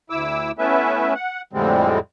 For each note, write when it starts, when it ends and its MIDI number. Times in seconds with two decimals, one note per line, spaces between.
0.10 0.51 38
0.10 0.51 64
0.10 0.51 86
0.10 0.51 88
0.58 1.14 57
0.58 1.14 59
0.58 1.14 61
0.58 1.14 64
0.58 1.14 71
0.58 1.14 76
1.14 1.42 78
1.53 1.99 41
1.53 1.99 45
1.53 1.99 50
1.53 1.99 55
1.53 1.99 56
1.53 1.99 60